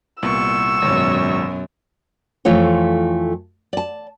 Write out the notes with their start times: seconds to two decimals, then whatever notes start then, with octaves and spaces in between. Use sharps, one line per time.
0.22 C2 A#2 B3 C#6 E6
0.82 G#1 C#2 F#2 B2 C#5
2.45 F2 E3 A3 F4 C#5
3.73 D5 A5